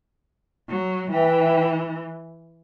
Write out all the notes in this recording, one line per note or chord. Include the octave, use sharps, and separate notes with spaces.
F#3
E3 B4 E5 G5